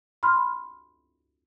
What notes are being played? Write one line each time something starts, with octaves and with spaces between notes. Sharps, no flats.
B5 C6 F6